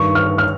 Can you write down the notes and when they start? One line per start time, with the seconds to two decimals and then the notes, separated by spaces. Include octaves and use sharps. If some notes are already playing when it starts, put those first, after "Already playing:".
Already playing: G2 D#3 C#6
0.15 F6
0.38 F6